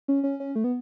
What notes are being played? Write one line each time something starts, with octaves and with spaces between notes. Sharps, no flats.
C#4
C#4
C#4
A3
B3